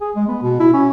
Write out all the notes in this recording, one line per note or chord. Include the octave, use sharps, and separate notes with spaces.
G#4
G#3
B3
B2
E4
C#4